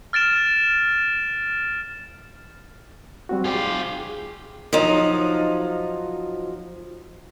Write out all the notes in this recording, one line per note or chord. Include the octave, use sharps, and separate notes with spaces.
F6 A6 D7 E7
G3 C4 F#4
F4 G4 G#4 G5
F3 F#3 D#4